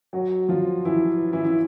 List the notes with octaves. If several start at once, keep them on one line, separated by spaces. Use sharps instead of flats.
F#3 F#4
F3 F4
E3 E4
E3 E4
E4